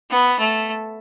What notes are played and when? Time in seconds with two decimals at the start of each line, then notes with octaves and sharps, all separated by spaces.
0.10 B3
0.39 A3